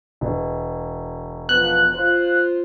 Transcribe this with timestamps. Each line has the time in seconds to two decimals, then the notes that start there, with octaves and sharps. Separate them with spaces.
0.21 E1
1.49 F3 B3 F#6
1.95 F4 C5